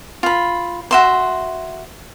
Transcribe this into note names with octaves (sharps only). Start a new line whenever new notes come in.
F4 B5
F#4 E5 C6